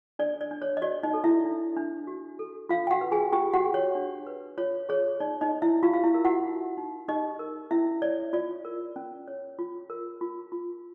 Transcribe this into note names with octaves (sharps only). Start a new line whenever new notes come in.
D4 D5
D5
D4
C#5
D#5
F#4 D5
D#4 D#5
A4
E4 E5
D4
D4
F#4
A4
D4 F4 F5
G5
F#4 F#5
B4
G#4 G#5
F4 G4 G5
F#4 F#5
G#4
C#5
D4
B4
F4 C#5
G#4 C#5
D#4 D5
D#4 D#5
D#4
E4 E5
F4 G4 F5
F5
E4 E5
A#4
F#4 F#5
D#4
D#4
D#4 G4 D#5
A#4
C#4 E4 E5
C#5 D5
F4 D5
A#4
C#4
C#5
F4
A#4
F4
F4